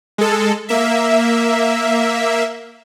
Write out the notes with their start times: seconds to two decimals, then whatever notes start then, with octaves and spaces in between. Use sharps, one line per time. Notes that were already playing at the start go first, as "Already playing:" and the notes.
0.18 G#3 A4
0.69 A#3 E5